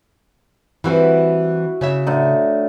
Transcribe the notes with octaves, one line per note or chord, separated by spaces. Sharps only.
E3 G3 C4 E4 F#4 B4
C#3 C#5 E5
A2 D3 D#4